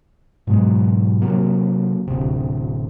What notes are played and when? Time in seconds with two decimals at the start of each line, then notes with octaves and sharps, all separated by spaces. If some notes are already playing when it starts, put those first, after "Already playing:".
0.47 G#2 B2 F#3 G#3
1.22 C3 F3 F#3 A#3
2.07 D1 D2 C3